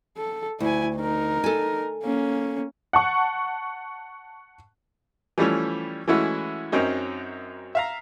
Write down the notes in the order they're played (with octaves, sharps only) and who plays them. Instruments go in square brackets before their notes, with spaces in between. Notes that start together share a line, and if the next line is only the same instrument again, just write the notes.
[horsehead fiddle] A4
[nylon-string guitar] D2 [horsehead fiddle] E4 G#5
[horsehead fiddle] D#4 A#4
[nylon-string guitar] A4 G#5
[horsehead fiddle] A#3 C#4
[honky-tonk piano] F#5 A5 C#6
[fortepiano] E3 F3 G3 A3 C#4
E3 G#3 A3 C#4 E4 F#4
F#2 F#3 C4 C#4 D#4
E5 F5 A#5